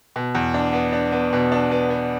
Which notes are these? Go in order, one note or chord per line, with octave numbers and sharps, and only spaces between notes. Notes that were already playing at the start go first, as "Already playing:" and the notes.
B2
E2
D4
B3
D4
B3
B2
D4
B3
B3